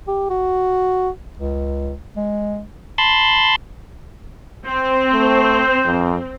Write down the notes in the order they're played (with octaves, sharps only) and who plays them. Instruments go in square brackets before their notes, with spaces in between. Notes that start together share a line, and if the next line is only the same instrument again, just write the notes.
[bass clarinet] G4
F#4
C#2
G#3
[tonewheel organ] A5 B5 C6
[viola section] C4 [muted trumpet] C5
[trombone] A3
F2